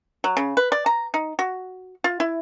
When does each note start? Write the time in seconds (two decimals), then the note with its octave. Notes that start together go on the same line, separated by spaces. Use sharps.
0.24 F#3
0.37 C#3
0.57 B4
0.72 D5
0.86 A#5
1.14 D#4
1.39 F#4
2.04 F4
2.20 E4